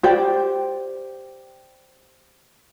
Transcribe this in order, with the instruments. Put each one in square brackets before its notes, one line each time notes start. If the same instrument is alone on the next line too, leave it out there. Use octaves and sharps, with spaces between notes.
[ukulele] G4 C5 D5 G5